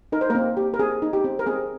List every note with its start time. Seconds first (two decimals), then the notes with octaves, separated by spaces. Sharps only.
0.12 D#4 A#4
0.21 C5
0.30 A#3 C4 A#4
0.57 G4
0.74 A#4
0.79 C4 G#4
1.02 D#4
1.13 G4
1.24 C4
1.39 A#4
1.46 C4 G#4